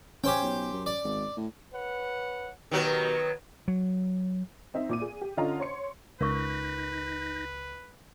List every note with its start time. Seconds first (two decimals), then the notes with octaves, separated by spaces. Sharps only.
0.24 C#4 G4 C5 G5
0.42 B1
0.73 F#2
0.86 D5
1.04 G#1
1.37 A2
1.72 B4 C#5 F#5
2.71 B2 D#3 F#3 B3 G4 A#4
3.68 F#3
4.74 C4 D#4 E5
4.89 A#2 D6 D#7
5.02 G#4
5.21 G4
5.37 D3 C#4 F4 D#5 A#5
5.58 C5 C#5 C6 C#7
6.21 C#2 D#4 A#4 B4 F5 C#6 G6 A#6